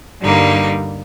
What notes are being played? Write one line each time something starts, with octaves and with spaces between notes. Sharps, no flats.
G2 D3 G3 A#3 D#4